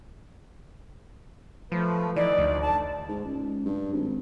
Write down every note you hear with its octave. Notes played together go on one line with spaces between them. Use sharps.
F3 A3 B4
E3 D#4 D5
D2
A5
G#2
C#2
G2
G#1